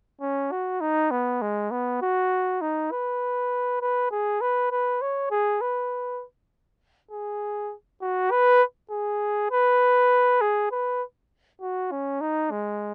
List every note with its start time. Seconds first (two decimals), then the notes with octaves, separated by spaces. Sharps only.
0.21 C#4
0.52 F#4
0.81 D#4
1.11 B3
1.42 G#3
1.71 B3
2.02 F#4
2.61 D#4
2.91 B4
3.81 B4
4.11 G#4
4.41 B4
4.71 B4
5.02 C#5
5.31 G#4
5.61 B4
7.11 G#4
8.01 F#4
8.31 B4
8.91 G#4
9.51 B4
10.41 G#4
10.71 B4
11.61 F#4
11.91 C#4
12.21 D#4
12.51 G#3